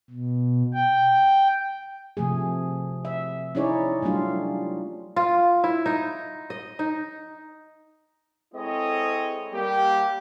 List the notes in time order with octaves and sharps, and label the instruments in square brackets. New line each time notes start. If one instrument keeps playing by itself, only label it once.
[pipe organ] B2
G5
[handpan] C3 F3 A3 G#4
E5
C#4 D#4 E4 G#4 C#5 D5
F#3 G3 A3 D4 F4
[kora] F4
E4
D#4
D#5
D#4
[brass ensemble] G#3 C4 E4 A4 C#5 D#5
G3 A#3 G4